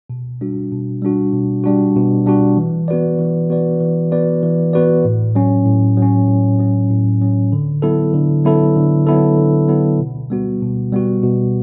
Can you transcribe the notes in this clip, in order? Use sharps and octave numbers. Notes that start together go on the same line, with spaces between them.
B2
G3 D4 F#4
B2
G3 D4 F#4
B2
G3 D4 F#4
B2
G3 D4 F#4
E3
B3 F#4 B4 D5
E3
B3 F#4 B4 D5
E3
B3 F#4 B4 D5
E3
B3 F#4 B4 D5
A2
F#3 C#4
A2
F#3
C#4
A2
F#3 C#4
A2
F#3 C#4
D3
F#3 B3 E4 A4
D3
F#3 B3 E4 A4
D3
F#3 B3 E4 A4
D3
F#3 B3 E4 A4
B2
G3 B3 F#4
B2
G3 B3 F#4
B2